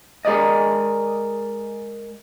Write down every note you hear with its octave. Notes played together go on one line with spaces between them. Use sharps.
G#3 G#4 A#4 D5 D#5